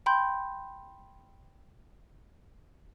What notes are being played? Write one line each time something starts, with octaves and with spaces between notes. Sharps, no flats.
G5 B5 C6 G6